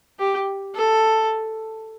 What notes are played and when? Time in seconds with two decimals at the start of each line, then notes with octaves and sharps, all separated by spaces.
0.19 G4
0.75 A4